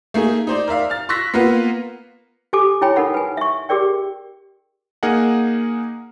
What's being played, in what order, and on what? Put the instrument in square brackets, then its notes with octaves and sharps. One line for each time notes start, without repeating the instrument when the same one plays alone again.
[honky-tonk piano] A3 A#3 D#4 G#4
D#4 C5 D5
A#4 D5 E5 F5
F6 A6
C6 C#6 E6 F#6 A#6 B6
A#3 B3 F4 B4 F5 F#5
[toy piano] G4 A4 G#5 D6
E4 C#5 G5 G#5 B5
D#4 A4 A#4 F#5 B5
B4 G#5
E5 C#6
G4 G#4 A#4 D5 G5
[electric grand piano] A#3 D#4 G#4 A#4 D#5 F#5